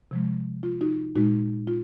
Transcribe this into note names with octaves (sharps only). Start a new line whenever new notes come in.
C3 F3 G#3
F4
D#4 F#4
A#2 G#3 D#4 F#4
F4